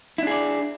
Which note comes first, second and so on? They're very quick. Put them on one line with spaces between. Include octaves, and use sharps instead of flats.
E4 D4 G#4 D5